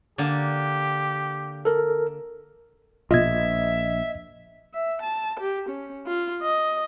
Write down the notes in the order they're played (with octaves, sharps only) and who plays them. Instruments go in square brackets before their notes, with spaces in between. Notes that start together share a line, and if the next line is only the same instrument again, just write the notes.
[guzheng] D3 A#3 A5 [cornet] G4
[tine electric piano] A4 A#4
[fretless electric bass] A#1 [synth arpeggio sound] B2 F4 [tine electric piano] D#5 G#6 [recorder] E5
[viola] E5
A5
G4
C#4
F4
D#5